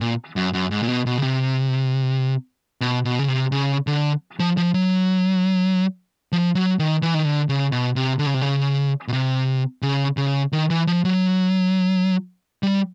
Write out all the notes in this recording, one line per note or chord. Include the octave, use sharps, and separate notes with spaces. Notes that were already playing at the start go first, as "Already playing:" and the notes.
A#2
F#2
F#2
G#2
A#2
B2
B2
C#3
C3
B2
B2
C#3
C3
C#3
D3
F3
F3
F#3
F3
F#3
D#3
E3
D#3
D3
C#3
B2
C3
D3
C#3
C3
C#3
B2
C3
C#3
C#3
D#3
E3
F3
F#3
G3